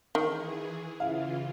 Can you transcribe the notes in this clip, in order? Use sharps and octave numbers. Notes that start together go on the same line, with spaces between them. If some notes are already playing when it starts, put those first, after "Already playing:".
D#3 E3 G#4
C#3 E3 E4 F4 F5